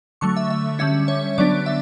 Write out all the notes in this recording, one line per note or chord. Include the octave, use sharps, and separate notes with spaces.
D3 F#3 A3 C#6
E5
E5
D3 G3 C#4 E5
C#5
D3 F#3 B3 D4 D5
E5